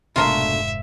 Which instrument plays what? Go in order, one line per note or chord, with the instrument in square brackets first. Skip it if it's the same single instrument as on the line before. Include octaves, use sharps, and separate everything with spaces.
[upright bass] F1 G#2 [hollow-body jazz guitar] B2 A3 D4 [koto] F4 A#4 [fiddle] E5